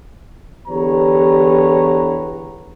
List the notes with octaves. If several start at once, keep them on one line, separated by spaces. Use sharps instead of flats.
E2 D3 G4 B4 C#5 A#5